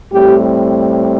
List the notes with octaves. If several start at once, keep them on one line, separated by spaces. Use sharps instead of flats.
A2 G3 C4 G4